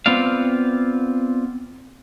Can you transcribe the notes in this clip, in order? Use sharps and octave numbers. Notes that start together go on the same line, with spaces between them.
B3 C4 F4 D5 F5